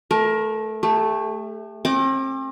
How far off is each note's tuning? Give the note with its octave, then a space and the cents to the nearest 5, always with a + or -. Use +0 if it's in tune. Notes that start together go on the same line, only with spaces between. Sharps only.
A3 -15 A#4 +20
A3 +0 G4 +40
C4 +40 G5 -25 D6 +20